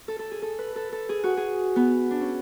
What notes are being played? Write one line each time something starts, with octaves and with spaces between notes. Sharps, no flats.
A4
A4
G#4
A4
B4
A4
A4
G#4
F#4
G#4
B3
D4
C#4